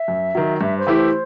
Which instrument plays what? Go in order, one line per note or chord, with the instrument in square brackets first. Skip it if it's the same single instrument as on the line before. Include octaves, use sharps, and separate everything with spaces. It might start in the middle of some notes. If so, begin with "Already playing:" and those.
Already playing: [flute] E5
[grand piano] F#2
D#3 F#3
[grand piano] G2 [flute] E5
[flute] C5
[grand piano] E3 A3 E4 G4
[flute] C5